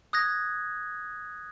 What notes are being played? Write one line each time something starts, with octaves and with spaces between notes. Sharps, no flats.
D#6 F#6 G#6 A#6